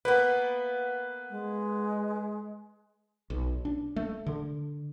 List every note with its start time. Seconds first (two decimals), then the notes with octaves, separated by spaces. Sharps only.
0.05 A#3 B3 B4
1.30 G#3
3.30 B1
3.65 D4
3.96 A3
4.26 D3